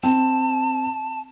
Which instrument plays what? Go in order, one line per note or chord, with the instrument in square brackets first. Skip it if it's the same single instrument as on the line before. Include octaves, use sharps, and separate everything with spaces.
[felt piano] C4 [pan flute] A5